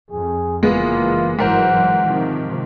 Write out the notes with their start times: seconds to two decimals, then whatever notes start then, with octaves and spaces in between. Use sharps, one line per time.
0.11 F2 G#4
0.63 F#1 E3 G#3 A#3 B3 F4
1.39 G1 G#2 E3 F#3 A#4 C5 F#5
2.04 C3 D#3 F3